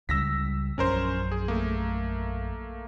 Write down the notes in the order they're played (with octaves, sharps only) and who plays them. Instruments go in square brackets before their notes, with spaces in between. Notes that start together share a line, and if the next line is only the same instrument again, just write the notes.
[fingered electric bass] C#2 C#3 G3 [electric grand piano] E6 A#6 B6
[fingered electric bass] A#1 F#2 [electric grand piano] C#4 A#4 C5
[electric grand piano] G#4
A3 A#3